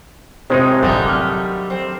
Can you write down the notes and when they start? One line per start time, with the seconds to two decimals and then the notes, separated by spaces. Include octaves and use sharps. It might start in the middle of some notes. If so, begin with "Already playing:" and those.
0.50 A2 C3 D#3 G#3 C4 D#4
0.83 D3 D#3 F#3 G3 A3
1.06 D6 F6
1.70 C4